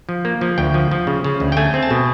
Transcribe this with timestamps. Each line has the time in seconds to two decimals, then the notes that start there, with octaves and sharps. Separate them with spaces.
0.09 F3
0.25 A#3
0.41 F3
0.58 D2 G5
0.74 F3
0.91 F3
1.07 C#3
1.24 C#3
1.40 D2
1.52 G5
1.57 A3 G#5
1.74 C4
1.83 A5
1.90 B2